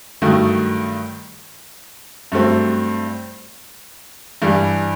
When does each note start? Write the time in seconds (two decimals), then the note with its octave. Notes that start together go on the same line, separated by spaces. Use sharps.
0.22 G2 D#3 F#3 A3
2.32 G2 F#3 A3 C4
4.42 G2 E3 G3